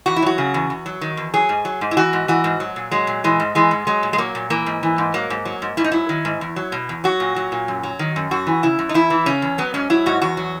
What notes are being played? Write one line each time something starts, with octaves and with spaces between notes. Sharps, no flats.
E2 F#4
E4
F#3 F#4
C#3
E2
E2
F#3
D#3
E2
F#3 G#4
G#2
F#3
G#2
E4
E3 F#4
G#2
E3 F#4
G#2
F#3
A#2
F#3 G#3
A#2
E3 G#3
G#2
E3 G#3
G#2
F#3 G#3
A#2
G#3
F#3 A#3
A#2
E3 A#3
G#2
E3
G#2
F#3 A#3
G#2
F#3
G#2
G#2 E4
D#4
F#3 E4
D#3
G#2
E2
F#3
B2
E2
F#3 F#4
A#2
F#3
A#2
F#2
F#3
D#3
F#2
F#2 F#4
E3
C#3 E4
F#2
D#4
E2 E4
E3
C#3 C#4
E2
F#3 B3
G#2 C#4
F#3 E4
G#2 F#4
E2 F#4
F#3